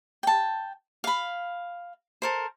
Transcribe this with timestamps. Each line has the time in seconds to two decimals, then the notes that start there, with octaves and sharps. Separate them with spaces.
0.23 G5 A5
1.04 F5 B5
2.22 A4 A#4 C5